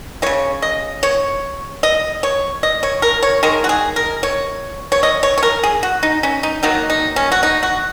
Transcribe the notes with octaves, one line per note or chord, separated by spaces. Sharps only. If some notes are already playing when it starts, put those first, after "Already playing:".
C#3 G#3 C#5
D#5
C#5
D#5
C#5
D#5
C#5
A#4
C#5
D#3 G#3 A#4
F#4
G#4
A#4
C#5
C#5
D#5
C#5
C#5
A#4
G#4
F#4
D#4
C#4
D#4
D#3 F#3 A#3 D#4
D#4
C#4
F#4
D#4
F#4